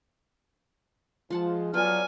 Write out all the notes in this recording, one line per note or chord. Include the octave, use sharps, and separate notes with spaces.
F3 G#3 F4 F#5 A5
F#3 B3 F4 A4 D5 G#5 F6